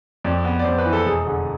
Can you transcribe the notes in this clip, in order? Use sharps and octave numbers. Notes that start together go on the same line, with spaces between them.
F2 D5
B3
D5
F2 C5
B4
E3
A4
E1 G#4
D3